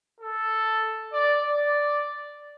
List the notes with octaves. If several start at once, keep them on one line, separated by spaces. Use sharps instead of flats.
A4
D5
D5